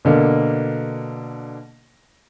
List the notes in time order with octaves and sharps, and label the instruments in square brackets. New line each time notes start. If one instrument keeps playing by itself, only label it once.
[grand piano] B2 D3 A#3